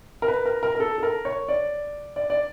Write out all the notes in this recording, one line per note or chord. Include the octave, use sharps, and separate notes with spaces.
A#4
B4
A#4
A#4
A#4
A4
A4
A#4
C#5
D5
D5
D5